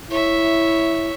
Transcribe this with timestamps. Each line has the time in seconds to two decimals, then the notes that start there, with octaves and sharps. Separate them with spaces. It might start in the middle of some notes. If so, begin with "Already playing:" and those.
0.10 E4 C#5 E5